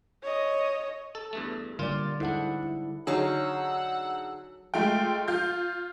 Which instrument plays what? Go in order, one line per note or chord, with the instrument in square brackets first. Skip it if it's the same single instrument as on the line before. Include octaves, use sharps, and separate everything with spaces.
[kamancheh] C#5 D#5
[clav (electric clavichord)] A4
E2 G2 A3
[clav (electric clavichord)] A#2 F4 [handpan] D3 G3 D5
[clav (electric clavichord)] G#2 D4 [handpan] E4 A4 F#5
[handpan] E4
[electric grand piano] D3 D#4 G#4 [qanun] F#3 F5 C#6 [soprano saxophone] F#5 [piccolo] E6
[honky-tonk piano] G#3 A3 F4 G5
F4 G6